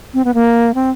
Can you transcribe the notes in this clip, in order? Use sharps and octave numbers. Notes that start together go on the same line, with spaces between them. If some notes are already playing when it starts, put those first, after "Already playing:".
C4
B3
A#3
C4